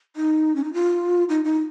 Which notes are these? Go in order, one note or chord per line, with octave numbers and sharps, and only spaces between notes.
D#4
C#4
D#4
F4
D#4
D#4